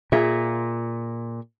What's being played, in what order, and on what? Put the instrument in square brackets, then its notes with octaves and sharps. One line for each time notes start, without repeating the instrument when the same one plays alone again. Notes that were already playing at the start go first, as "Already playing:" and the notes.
[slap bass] A#2 [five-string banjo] F4 G#4 E5